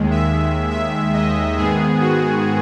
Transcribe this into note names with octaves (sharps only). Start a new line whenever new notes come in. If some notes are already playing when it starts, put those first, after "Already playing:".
Already playing: D#2 D#3 G#3
E5
E5
D#5
G#2 D#3 G#3 B3 G#4
F#4